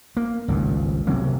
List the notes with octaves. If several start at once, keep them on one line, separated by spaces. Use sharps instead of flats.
A#3
G#1 C#2 G2
C2 C3 F#3 A#3